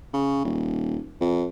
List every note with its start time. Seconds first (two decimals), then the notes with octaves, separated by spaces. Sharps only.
0.14 C#3
0.45 D#1
1.21 F2